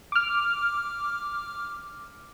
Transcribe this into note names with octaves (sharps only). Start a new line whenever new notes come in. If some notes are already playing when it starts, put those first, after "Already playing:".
D6 F6